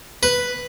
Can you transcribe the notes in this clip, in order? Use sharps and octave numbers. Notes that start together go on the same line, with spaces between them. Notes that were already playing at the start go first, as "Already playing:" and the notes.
B4